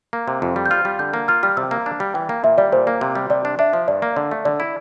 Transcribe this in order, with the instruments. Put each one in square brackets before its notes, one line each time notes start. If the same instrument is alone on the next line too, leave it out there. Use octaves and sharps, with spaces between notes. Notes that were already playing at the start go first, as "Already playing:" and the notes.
[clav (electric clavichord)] A#3
C3
F2
G3
[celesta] G6
[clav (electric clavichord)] F4 [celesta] F6
[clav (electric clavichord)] G3
[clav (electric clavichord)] D3 [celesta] G6
[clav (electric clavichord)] A#3
[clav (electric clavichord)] F4 [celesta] F6
[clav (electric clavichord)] G3 [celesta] F6
[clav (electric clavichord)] C3 [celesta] E6
[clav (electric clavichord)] A#3
D4
G3
[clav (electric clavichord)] E3 [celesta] G5
[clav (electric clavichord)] A#3
[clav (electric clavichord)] A#2 [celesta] E5
[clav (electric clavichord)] G3 [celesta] D5
[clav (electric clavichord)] A#2 [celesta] C5
[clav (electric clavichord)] A#3
C3
G3
[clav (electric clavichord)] C3 [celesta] D5
[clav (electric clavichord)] D4
[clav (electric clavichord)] D4 [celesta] E5
[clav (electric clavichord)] F3
[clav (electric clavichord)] G2 [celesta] D5
[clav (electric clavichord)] A#3
[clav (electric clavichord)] D3 [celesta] D5
[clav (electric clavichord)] A3
[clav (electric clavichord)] D3 [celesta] D5
[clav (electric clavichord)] E4